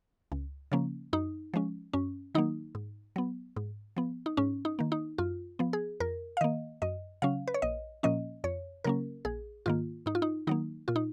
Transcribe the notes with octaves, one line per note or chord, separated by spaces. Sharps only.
C#2
C#3 F3 A#3 C#4
F#2 D#4
F3 G#3 C#4
F#2 C#4
D#3 F#3 A#3 D#4
G#2
F#3 B3
G#2
F3 B3
D#4
G#2 C#4
D#4
D#3 A#3
D#4
F#2 F4
F3 B3
G#4
F2 A#4
F5
D#3 A#3 D#5
F#2 D#5
C#3 F#3 C#4 F5
B4
C#5
A#1 D#5
A#2 F3 A#3 C#4 D#5
F2 C#5
C#3 F#3 A#3 C#4 A#4
A#1 G#4
G#2 D#3 A#3 F4
G#2 D#4
F4
D#4
D#3 F#3 A#3 D#4
A#2 F4
D#4